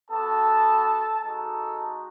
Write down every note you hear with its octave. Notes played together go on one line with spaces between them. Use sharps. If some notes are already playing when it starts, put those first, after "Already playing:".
B3 F#4 A4 A5
G#3 D#4 F#4 A4 A5